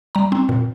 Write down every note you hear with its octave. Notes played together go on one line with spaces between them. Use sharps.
G3 A#5
C4
A#2